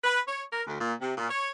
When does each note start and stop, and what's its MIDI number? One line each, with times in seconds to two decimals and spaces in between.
0.04 0.19 71
0.28 0.43 73
0.52 0.63 70
0.67 0.77 38
0.80 0.93 46
1.00 1.12 48
1.17 1.28 46
1.30 1.50 73